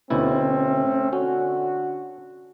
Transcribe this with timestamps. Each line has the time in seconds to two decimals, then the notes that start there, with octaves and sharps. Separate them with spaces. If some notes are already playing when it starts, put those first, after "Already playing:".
0.10 D2 B2 A3 C4 C#4 E4
1.13 D3 C#4 F#4